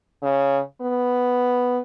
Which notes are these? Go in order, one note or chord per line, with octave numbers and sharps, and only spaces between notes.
C#3
B3